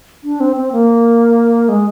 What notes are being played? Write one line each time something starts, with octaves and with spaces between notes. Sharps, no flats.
D4
C4
C4
A#3
G#3